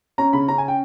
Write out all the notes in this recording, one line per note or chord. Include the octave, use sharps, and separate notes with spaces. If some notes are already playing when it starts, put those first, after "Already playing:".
C#4 A#5
C#3 B5
C#4 A#5
G#5
G5